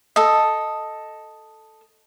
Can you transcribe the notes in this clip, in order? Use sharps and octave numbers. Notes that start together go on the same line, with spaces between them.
A4 D#5